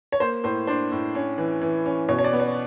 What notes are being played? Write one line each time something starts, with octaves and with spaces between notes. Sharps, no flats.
C#5
A#3 C5
A2 C5
D4 C5
A2
C#4
E3
E3
C#4
B2 C#5
C#5
D5
B3
C#5